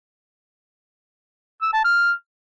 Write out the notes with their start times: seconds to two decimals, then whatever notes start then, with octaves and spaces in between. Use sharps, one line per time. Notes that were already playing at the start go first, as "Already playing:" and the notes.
1.62 E6
1.73 A5
1.84 F6